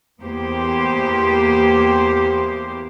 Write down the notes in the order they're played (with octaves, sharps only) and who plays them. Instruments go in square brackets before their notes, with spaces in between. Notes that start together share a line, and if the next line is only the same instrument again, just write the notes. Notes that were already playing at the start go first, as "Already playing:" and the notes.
[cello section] E2 A#3 B3 G4 C5